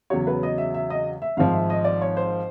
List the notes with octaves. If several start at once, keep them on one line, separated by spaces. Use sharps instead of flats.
E2 C#3 F#3 C#5
B4
D#5
E5
E5
D#5
E5
G#1 G#2 F3 F5
E5
D#5
D5
C#5
C5